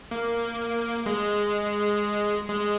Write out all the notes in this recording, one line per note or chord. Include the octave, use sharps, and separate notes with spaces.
A#3
G#3
G#3